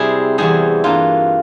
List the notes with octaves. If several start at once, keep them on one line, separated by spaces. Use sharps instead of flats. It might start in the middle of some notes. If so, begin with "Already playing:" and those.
Already playing: C3 G3 C4 E4 G#4
E2 C3 E3 G3 G#4
G2 E3 A#3 F4